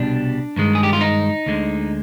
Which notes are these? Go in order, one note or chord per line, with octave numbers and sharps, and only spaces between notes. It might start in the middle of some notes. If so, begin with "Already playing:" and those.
Already playing: C2 B2 G3 D4
G2 D#3 G#3
G#4
G4
F4
D#4
D2 D3 G#3